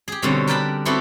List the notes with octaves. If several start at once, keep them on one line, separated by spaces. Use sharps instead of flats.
G4 G#4
B2 D3 G3 C4 C#4
A#4 B4 D5 G5 A5 B5
B3 C4 E4 F#4 G4 A4